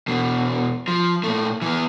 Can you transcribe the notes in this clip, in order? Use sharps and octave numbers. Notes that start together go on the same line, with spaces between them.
E2 B2
F3
A#2 A3
E3 B3